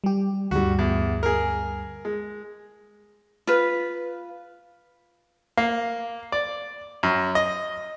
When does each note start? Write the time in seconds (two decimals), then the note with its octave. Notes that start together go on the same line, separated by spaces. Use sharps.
0.04 G3 G4
0.51 D2 G2 G3 F#4
0.79 E2
1.23 G#4 A#4
2.05 G#3
3.47 F4 B4
5.57 A#3
6.32 D5
7.03 F#2
7.35 D#5